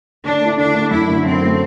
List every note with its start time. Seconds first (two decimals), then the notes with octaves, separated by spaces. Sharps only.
0.24 D3 D4
0.41 A3 E4
0.57 D3 D4
0.74 A3 E4
0.91 F#2 E4
1.08 D3 A3
1.24 F#2 C4
1.41 D3 A3